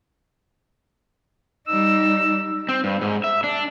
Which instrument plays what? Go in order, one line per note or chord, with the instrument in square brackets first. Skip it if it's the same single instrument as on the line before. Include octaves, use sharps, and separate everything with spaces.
[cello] G3 D#4 [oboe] E6
[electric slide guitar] C4
G2
G#2
E5
D4